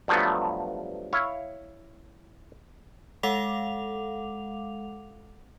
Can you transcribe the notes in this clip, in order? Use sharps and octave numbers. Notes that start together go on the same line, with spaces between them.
G2 F3 F#3 A3 B3
E4 C#5 F5
G#3 A4 F5 F#5 D6 F7